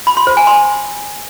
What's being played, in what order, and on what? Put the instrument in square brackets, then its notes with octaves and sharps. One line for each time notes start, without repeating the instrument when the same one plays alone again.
[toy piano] B5
C6
C5
G#5
C6